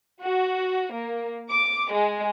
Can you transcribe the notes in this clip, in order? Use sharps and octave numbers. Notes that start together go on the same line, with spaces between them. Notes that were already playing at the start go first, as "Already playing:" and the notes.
F#4
A#3
D6
G#3